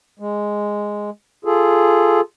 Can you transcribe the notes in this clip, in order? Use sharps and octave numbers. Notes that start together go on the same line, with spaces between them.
G#3
F4 G#4 A4